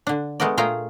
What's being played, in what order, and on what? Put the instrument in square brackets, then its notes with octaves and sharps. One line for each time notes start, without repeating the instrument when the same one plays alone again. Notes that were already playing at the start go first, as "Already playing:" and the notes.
[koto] D3 D4
G#3 A3 B3 A#4 D5
A#2 A3 F4 G#4 G5 A#5